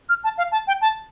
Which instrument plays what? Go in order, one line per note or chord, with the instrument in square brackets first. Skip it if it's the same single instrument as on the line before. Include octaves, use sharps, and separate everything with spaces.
[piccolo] F6
A5
F5
A5
G5
A5